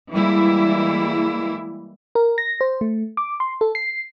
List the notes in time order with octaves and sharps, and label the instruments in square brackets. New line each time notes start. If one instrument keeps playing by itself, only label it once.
[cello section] E3 G3 G#3 A#3 E4
[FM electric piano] A#4
A#6
C5
A3
D6
C6
A4
C7